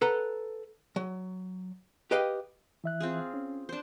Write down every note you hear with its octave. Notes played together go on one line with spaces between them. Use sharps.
A4 B4 F#5 A#5
F#3
G4 B4 D#5 F5 G5
E3 E5 F#6
C4 F4 G#4
C#4
D4 C5